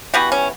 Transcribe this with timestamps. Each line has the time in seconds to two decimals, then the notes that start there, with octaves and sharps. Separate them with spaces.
0.14 E3 G3 B3 F#4
0.32 C#4